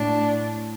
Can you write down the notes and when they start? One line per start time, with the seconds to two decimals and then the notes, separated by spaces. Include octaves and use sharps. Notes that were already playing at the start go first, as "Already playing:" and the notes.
Already playing: A2 D4